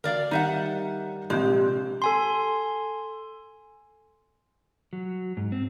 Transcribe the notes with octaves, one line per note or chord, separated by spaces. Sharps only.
D2 A#4 D5 F5
D#3 G3 D#4 E5 F#5
A#1 C3 G#3 G4 G6
A4 G#5 C6
F#3
G#2
C4